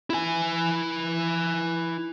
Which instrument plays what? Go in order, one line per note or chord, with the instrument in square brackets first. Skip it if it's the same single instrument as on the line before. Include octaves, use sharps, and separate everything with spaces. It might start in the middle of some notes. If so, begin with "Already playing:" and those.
[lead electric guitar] E4 G#5